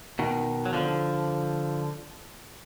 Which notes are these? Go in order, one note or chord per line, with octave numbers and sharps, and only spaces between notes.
B2 D#3
F#3
D3 F3